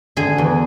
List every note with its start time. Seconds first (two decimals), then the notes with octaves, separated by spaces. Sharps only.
0.17 D3 G#4
0.38 E2